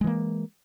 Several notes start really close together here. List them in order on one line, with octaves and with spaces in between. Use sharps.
G#3 E3 A#3